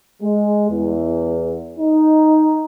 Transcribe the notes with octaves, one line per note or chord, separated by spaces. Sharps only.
G#3
E2
D#4